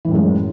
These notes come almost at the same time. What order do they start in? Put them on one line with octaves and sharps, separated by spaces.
E3 A2 F#2 G#3